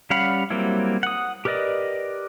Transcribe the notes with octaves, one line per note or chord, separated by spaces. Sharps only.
G3 C#4 F5 F#5 B5
F#3 G3 A#3 C4 E4
F#5 D#6
G4 A#4 B4 D5 D#5